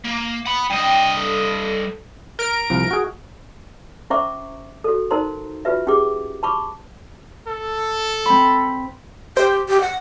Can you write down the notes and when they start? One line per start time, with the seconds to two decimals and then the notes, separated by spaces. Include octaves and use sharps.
0.05 A#3
0.46 F#5 B5
0.70 G2 D#5 G5
1.16 A4
2.39 A#4 D7
2.70 C2 F3
2.91 F#4 G#4
4.10 C#4 C5 E5 A#5 C#6 D6
4.84 F#4 A4
5.11 D#4 A#4 C5 A#5 C6
5.65 F4 F#4 B4 E5
5.87 C#4 G4 G#4 D6
6.43 A5 B5 C#6 D6
7.48 A4
8.26 C4 B5
9.37 G4 C5 G5
9.69 G4
9.81 F#5